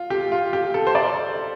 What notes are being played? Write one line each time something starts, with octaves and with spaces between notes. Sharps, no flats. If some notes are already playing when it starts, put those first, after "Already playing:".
Already playing: F4
G4
F4
G4
A4
C5
D5